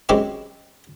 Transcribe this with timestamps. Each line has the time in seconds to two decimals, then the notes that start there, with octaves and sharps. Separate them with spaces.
0.09 F#2 G#3 C4 E4 G4 C#6